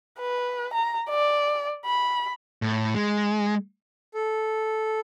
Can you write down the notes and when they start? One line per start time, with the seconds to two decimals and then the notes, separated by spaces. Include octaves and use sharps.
0.19 B4
0.73 A#5
1.09 D5
1.85 B5
2.62 A2
2.95 G#3
4.14 A4